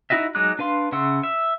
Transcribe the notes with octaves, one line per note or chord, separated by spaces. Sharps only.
D#4 E4 F#4 D#5 E5
F#3 G#3 D#4 D6 F#6
D4 B4 F5 C6
C#3 E5 F#5 C6 E6
E5